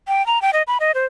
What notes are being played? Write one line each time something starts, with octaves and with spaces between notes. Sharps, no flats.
G5
A#5
G5
D#5
B5
D#5
C5